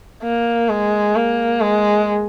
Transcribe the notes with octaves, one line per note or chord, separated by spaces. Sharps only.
A#3
G#3
A#3
G#3